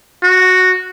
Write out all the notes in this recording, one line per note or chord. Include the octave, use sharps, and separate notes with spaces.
F#4